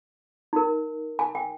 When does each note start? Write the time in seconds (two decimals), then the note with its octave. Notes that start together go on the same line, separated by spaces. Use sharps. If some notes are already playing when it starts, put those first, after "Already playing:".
0.53 D#4 A#4
1.19 G#5
1.35 G5